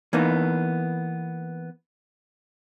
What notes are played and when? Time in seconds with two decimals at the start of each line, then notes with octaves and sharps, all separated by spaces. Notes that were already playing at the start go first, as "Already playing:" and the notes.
0.13 E3 A#3 B3 D#4